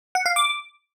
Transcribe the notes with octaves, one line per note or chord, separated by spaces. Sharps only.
F#5
F5
D6